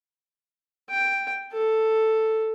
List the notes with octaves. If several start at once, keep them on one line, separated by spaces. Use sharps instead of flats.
G5
A4